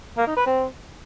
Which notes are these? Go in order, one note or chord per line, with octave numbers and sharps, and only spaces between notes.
A#3
D#4
B4
C4